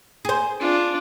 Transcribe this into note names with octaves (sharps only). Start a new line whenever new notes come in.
G#4 C5
D4 F4